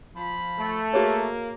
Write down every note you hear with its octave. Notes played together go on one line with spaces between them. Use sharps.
F3 B5
A3
A#3 F#4 G#4 C#5